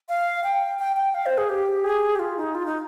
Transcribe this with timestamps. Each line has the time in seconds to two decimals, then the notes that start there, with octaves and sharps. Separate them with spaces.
0.09 F5
0.44 G5
0.79 G5
0.96 G5
1.14 F5
1.26 C5
1.38 G#4
1.49 G4
1.84 G#4
2.15 G4
2.19 F4
2.37 D#4
2.55 F4
2.66 D#4